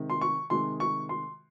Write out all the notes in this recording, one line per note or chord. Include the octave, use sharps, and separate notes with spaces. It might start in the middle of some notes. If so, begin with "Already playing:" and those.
Already playing: C3 D#3 G#3
C6
C#6
C3 D#3 G#3 C6
C#6
C6